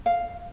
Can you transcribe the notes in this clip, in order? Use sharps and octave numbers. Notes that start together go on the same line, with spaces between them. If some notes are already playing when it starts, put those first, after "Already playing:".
F5